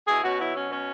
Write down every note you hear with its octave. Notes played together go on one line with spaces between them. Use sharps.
B2 E4 G#4
B2 C#4 F#4
F#3 B3 E4
B2 C#4
B2 C#4